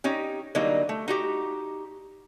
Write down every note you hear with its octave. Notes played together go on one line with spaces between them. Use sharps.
C#4 D#4 G4
D3 F#3 G3 A#3 D#4
A3
D#4 F#4 G4